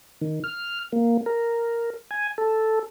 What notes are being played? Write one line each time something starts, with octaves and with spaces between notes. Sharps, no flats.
D#3
F6
A#3
A#4
G#5
A4